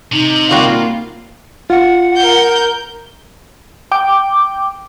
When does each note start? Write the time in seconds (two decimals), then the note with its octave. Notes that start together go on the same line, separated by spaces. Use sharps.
0.13 C3 D#4
0.51 G3 A#3 C4 F4 F#4
1.70 F4 F#5
2.16 A#4 G6
3.92 G5 D6